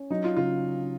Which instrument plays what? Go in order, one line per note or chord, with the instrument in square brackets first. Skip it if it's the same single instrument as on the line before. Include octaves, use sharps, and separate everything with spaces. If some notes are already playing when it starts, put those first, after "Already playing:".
Already playing: [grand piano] C#4
[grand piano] F#3 [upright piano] D#4
[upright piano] F4
[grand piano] C#3 [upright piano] F4